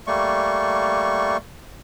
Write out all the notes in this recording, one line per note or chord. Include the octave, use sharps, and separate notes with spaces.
G3 A3 A#3 C#6